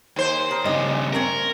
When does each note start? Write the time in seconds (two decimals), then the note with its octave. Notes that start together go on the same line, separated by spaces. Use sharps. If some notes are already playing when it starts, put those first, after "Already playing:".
0.16 D#2 C5
0.51 D#3
0.65 G2 C#3 D#5
1.13 A3 C4 C#4 A#4